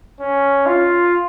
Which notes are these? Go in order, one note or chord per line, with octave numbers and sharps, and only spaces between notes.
C#4
F4